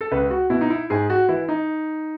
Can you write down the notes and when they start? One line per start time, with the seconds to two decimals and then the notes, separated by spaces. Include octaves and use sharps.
0.01 A4
0.12 C#2 B4
0.31 F#4
0.50 B2 E4
0.61 D#4
0.70 E4
0.90 G#2 G#4
1.10 F#4
1.29 E3 E4
1.48 D#4